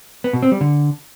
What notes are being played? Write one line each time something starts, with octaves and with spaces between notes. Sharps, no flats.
B3
B2
C4
G3
D3